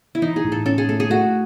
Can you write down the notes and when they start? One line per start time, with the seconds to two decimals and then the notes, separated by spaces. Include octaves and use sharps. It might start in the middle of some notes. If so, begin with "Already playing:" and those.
0.15 E4
0.22 E3 D#4
0.36 G#4
0.45 A2
0.52 A4
0.66 C#4 A4
0.78 G#4
0.88 A3 A4
1.00 G#4
1.10 A3 F#4